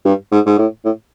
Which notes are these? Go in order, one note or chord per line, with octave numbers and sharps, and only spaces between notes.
G2
G#2
G#2
A2
A2